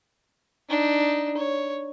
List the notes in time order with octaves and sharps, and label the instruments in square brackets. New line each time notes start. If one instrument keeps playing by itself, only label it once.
[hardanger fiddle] D4 D#4
C#5